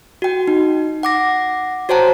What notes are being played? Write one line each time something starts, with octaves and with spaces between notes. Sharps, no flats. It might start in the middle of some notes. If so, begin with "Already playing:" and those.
F#4 G5
D#4
F#5 D6 A#6
F#4 C5 C#5 G5 A5 A#5